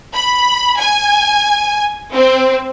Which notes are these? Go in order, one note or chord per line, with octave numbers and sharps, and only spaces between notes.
B5
G#5
C4